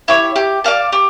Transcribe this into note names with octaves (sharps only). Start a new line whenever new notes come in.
E4 G4 C#5
G4
D5 F5 A5
G4